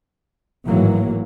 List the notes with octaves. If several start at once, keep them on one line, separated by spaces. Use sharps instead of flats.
G#1 A2 E3 F#3 A#3